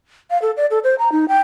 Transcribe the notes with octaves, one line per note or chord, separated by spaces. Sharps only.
F5
A4
D5
A4
C5
A#5
D#4
G5